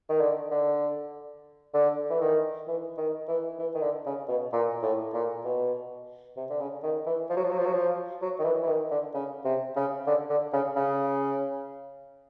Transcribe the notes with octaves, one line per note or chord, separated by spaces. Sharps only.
D#3
D3
D3
D3
E3
D#3
E3
D#3
E3
E3
D#3
D3
C#3
B2
A#2
A2
A#2
B2
C3
D3
C#3
D#3
E3
F3
F#3
F3
F#3
F3
F#3
F3
F#3
D#3
E3
E3
D#3
D3
C#3
C3
C#3
D3
D3
C#3
C#3